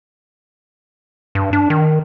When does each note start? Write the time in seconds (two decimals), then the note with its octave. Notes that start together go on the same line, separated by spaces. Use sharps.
1.35 G2
1.53 D4
1.70 D#3